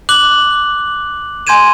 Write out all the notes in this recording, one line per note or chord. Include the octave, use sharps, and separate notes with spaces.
D6 F#6 F#7
G#5 C6 G6 G#6 D#7 E7